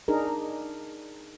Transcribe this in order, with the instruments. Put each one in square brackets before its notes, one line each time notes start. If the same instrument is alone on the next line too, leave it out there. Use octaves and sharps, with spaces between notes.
[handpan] D4 D#4 G#4 A#4